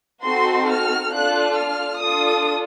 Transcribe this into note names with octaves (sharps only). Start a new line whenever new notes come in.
C4 D#4 F#4 A4 C6
F6
D4 F4 A4 F#6
F6
D4 F4 A4 D#6